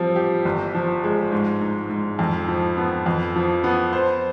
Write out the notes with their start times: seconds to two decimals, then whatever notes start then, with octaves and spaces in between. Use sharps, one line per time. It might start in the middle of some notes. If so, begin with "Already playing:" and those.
Already playing: F3 G3 C4
0.16 G4
0.45 G1
0.75 F3
1.04 G#3
1.32 G#2
1.61 G#2
1.89 G#2
2.19 F2
2.48 F3
2.77 B3
3.06 F2
3.36 F3
3.64 B3
3.93 C5